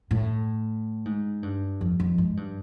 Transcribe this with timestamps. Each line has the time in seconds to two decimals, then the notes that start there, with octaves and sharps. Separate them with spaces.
0.11 A2
1.05 G#2
1.43 G2
1.81 F2
2.00 F2
2.18 G#2
2.37 G2